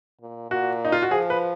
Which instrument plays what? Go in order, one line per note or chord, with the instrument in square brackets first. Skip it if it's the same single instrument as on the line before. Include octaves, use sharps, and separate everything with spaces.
[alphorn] A#2
[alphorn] A#2 [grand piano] F#4
[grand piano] D#4
F4
F#4
[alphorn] F3 [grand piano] G#4
[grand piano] B4